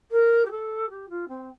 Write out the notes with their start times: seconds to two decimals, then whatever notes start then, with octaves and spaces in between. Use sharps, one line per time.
0.11 A#4
0.45 G4
0.51 A4
0.89 G4
1.09 F4
1.28 C4